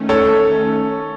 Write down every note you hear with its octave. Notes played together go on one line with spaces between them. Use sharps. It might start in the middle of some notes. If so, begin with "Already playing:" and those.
Already playing: D#3 A3 C#4
A4 C#5